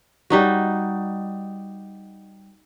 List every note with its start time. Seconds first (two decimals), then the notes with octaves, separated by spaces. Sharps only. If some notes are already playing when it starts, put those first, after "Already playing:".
0.30 G3 D#4 F#4